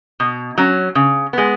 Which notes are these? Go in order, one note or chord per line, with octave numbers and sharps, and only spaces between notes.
B2
F#3 C#4
C#3
G#3 B3